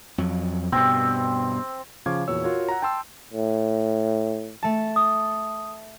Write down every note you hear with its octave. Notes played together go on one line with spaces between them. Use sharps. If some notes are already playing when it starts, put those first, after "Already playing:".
F2 F#3
G2 B2 C4
C#3 F3 F5 C#6 D6 G#6
E2 A#2 F#4 C#5 E6
F4 F#4 A#4 C#5
F#5 A#5
G5 A5 C6 E6
A2
A3 A5
D#6